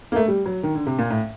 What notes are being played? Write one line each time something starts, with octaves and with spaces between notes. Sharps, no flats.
A#3
A3
G3
F#3
D#3
D3
C3
A#2
A2